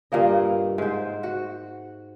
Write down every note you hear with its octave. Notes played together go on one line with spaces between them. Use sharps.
G2 A#2 A#3 D#5
G#2 C5
F#4